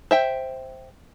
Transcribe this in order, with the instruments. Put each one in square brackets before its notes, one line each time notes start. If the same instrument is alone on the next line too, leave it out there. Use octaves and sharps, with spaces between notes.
[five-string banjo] C5 E5 G5